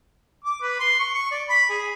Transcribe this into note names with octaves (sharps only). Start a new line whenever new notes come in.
D6
B4
C6
C#6
C#6
D5
B5
G#4